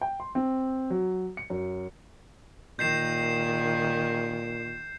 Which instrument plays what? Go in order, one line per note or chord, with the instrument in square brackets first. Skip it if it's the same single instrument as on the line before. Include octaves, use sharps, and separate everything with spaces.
[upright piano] G5
C6
C4
F#3
C#7
F#2
[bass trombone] A#2 [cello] D#3 [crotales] G6 C7 E7